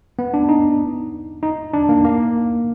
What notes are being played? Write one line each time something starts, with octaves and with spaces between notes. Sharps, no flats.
B3
D4
D#4
D#4
D4
A#3
A#3